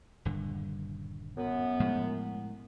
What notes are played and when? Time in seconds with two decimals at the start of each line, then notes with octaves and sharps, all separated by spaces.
0.25 D#1 G2 D3
1.37 F#2 B3
1.80 A2 F3 G#3